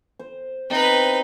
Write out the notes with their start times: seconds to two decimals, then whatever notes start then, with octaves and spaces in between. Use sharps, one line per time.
0.19 C5
0.70 C4 D#4 E4 B4